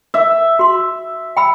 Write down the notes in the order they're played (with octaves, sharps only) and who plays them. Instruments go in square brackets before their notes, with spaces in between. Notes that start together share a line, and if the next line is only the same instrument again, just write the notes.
[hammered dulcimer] E5
[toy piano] F#4 C6
G5 B5 E6